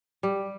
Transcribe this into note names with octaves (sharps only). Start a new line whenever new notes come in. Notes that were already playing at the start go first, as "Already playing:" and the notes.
G3